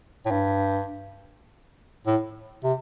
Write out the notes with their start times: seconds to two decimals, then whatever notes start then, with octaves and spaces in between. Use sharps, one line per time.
0.26 A2
0.31 G2
2.07 A2
2.64 C3